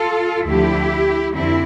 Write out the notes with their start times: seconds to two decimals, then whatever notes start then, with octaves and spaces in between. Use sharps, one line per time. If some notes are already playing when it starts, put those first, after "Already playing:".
Already playing: F4 A4
0.46 D2 D3 F3 E4 G4
1.33 F2 D3 C4 E4